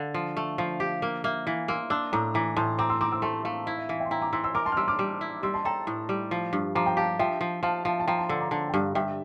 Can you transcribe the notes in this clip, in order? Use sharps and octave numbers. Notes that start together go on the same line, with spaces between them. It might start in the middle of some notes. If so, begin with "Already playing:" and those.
Already playing: D3 F5
F3
A3
F3 F5
G4 F5
A#3 F5
A#3 E5
E3 F5
A#3 C6 E6
D4 C6 E6
A2 A#5 D6
E3 A#5 D6
A2 A5 C6
C4 A#5 D6
C6 E6
C4 A#5 D6
C6 E6
A3 A5 C6
A3 F5 A5
E4 F5
E5
E3 F5
E5 G5
C6
E4 G5 A#5
A#5 D6
E3 C6 E6
C6 E6
A#4 A#5 D6
A5 C6
F6
G3 C6 E6
D6 F6
G3
E4
G3 C6 E6
A5 C6
A4 G5 A#5
A2
G3
F3
G2
F3 A#5 D6
G5 A#5
G4 F5 A5
F3 E5 G5
F3
F3 F5 A5
F3 F5 A5
A5
F3 G5 A#5
A5 C6
D3 C6 E6
A#5 D6
D3 A5 C6
G5
G2 F5 A5
G2 E5 G5